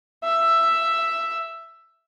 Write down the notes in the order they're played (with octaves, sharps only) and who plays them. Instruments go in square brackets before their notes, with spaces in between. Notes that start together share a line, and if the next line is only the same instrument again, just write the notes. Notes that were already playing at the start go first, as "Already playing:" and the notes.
[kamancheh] E5